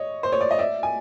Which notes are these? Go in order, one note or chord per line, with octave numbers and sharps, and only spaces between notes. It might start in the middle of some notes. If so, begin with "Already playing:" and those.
Already playing: C#5 D#5
C5
C#5
D5
D#5
D5 E5
G#5